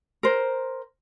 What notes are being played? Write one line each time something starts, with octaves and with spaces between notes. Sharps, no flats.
A#4 C5